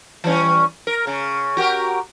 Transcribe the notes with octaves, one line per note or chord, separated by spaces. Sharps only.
E3 G3 C#4
A#4
C#3
F#4 G4 A#4